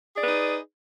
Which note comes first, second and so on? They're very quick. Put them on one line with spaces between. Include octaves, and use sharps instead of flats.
G#4 D5 B4 D#4